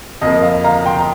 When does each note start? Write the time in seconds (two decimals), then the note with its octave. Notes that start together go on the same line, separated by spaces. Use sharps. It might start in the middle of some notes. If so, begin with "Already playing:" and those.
0.21 F2 F3 A#3 D#5
0.42 F5
0.64 F5 A#5
0.86 G5 C6
0.99 A#5